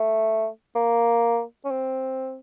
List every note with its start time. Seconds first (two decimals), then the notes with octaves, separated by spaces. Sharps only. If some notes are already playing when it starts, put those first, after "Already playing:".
Already playing: A3
0.75 A#3
1.65 C#4
1.71 C4